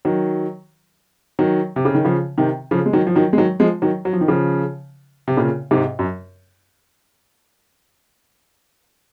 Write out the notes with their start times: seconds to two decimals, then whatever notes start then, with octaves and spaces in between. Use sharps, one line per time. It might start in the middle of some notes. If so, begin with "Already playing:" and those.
0.05 D#3 F#3
1.39 D#3 F#3
1.76 C3
1.85 C#3
1.95 D#3
2.05 C#3 F3
2.38 C3 D#3
2.71 C#3 F3
2.86 G#3
2.93 D#3 F#3
3.07 F3
3.15 D#3 F#3
3.33 G#3
3.38 D#3 F#3
3.60 F3 G#3
3.82 D#3 F#3
4.05 F#3
4.13 F3
4.21 D#3
4.28 C#3 F3
5.28 C3
5.37 A#2 C#3
5.71 G#2 C3
5.99 F#2